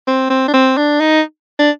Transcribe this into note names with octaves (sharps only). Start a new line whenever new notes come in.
C4
C4
D4
C4
D4
D#4
D4